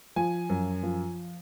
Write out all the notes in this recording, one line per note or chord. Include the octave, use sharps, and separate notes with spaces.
F3 G#5
F#2
F3